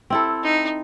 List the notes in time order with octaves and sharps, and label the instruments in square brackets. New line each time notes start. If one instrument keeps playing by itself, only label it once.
[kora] C4 E4 A4
[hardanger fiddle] D#4